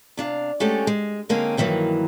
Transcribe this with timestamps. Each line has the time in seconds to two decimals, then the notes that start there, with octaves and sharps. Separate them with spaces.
0.17 C3 D4 F5
0.60 G#3 A3 C#4 F#4 G4 A4
0.87 G#3
1.29 D3 G#3 A#3 C4 C#4 D#4
1.57 G2 D#3 E3 F#3 A#3